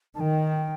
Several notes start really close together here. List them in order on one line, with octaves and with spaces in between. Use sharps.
D#3 A5 G5